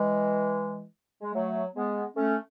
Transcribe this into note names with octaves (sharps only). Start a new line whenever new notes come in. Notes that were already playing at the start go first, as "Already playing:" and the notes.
Already playing: E3 G#3
G#3
F#3 A3
G#3 B3
A3 C#4